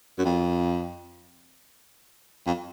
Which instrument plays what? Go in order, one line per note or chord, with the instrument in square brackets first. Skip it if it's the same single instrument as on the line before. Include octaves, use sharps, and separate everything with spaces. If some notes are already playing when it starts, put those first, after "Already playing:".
[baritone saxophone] F#2
F2
F2